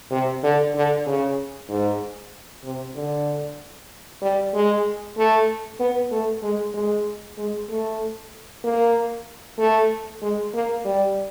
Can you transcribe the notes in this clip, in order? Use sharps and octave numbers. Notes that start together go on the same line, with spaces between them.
C3
D3
D3
C#3
G#2
C3
D3
G3
G#3
A3
B3
A3
G#3
G#3
G#3
A3
A#3
A3
G#3
A#3
G3